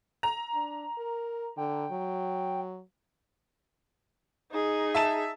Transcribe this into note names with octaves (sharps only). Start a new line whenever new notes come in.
A#5
D4
A#4
D3 G5
F#3
D#4 G#4
E5 A5 E7